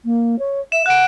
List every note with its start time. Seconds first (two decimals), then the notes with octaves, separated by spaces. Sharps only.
0.04 A#3
0.38 C#5
0.72 E5 E7
0.86 F#5 F#6 D7